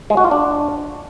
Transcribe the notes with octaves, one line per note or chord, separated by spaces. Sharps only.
G#3
F#4
F4
D4